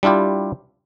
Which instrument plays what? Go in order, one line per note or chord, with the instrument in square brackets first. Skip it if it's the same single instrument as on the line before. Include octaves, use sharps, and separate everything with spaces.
[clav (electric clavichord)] G3 D4 E4 F4 G4